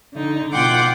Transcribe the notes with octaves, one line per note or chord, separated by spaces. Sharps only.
D3 D#4
B2 F4 F#5 G5 C6 D6